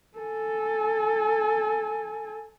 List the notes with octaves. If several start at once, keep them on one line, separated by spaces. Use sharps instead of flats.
A4 G#5